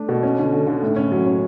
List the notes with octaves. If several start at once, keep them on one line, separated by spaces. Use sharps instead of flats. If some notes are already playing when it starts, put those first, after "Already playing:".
Already playing: A3 D4
B2
C#4
D3
D3
D3
A2
C#4
F#3
C#4